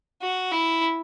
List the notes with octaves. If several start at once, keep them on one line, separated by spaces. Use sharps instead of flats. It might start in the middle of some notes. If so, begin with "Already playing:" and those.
F#4
E4